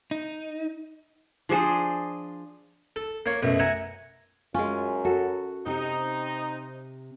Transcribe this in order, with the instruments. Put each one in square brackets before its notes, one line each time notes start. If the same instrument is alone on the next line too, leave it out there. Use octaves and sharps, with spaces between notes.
[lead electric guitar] D#4
[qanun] F3 D4 G#4 C5
[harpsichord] A4
A#3 C#5
F#2 B2 A3
E5 F#5 G#5 A#5
[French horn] F#2 [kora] G#3 C#4 [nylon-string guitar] F4
[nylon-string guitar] F#4 [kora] A4
[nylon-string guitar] C3 [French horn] C4 [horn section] D#4